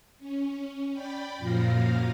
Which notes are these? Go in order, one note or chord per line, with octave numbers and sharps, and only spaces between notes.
C#4
D5 G5 B5
F#2 A#2 F3 F5 A#6